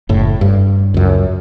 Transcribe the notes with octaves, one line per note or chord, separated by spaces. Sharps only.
F#1 A2
G2
C#2 F#2